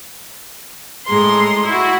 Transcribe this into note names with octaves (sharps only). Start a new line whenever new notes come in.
A2 G#3 A#5 C6
E4 F#4